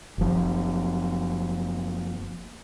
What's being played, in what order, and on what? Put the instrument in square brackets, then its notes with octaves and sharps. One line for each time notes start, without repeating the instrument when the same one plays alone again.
[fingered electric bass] F#1 F3